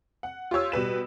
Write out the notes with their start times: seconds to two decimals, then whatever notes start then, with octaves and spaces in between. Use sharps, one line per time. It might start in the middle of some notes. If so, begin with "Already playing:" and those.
0.23 F#5
0.51 F4 G4 C#5 E6
0.72 B2 G3 B4 E7